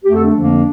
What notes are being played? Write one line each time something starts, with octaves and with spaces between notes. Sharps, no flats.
F2 D3 A3 G4
A4
D4
F2 D3 F3 A#3